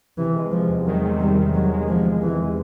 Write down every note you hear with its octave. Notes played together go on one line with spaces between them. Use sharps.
C3 E3
G#3
C3 F3
E2
D#3 F#3
C3
C3 G3
D#3
C3 F#3
G#3
D#3 F3
G#3
C3 E3